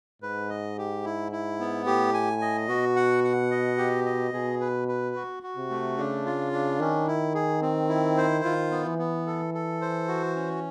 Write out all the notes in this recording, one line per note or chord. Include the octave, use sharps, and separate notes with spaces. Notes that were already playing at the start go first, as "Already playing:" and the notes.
G#2 B4
D#5
G4
E4
E4
B3
A2 G4
G#5
D#5
B2 F#4
F#5
F#5
D#5
G4
D#5
B2 G#4
B4
B4
F#4
F#4
C3
A3
C#3 D4
F4
D4
D#3 C#4
E4
G#4
C4
E4
C5
D#3 F4
B3
E3
B3
A4
A4
C5
F#4
C#4